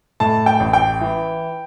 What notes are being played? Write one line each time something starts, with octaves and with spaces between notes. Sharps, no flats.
A2 A5
G5
A1
G5
E3